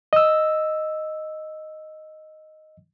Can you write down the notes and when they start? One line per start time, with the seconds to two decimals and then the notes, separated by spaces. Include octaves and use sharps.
0.13 D#5 E6